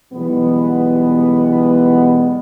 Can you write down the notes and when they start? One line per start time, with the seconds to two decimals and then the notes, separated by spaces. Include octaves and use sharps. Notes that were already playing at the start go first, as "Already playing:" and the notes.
0.13 B1 E3 G3 G#3 B3